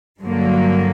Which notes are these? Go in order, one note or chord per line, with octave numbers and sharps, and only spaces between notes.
G2 D3 F#3 A#3